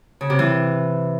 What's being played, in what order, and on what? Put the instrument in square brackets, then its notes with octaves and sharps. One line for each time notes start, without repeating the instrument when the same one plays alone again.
[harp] C#3
C3
E3